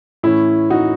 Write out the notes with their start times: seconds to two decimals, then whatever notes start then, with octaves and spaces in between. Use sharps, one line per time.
0.23 A2 E3 C#4 E4
0.70 D#4 F#4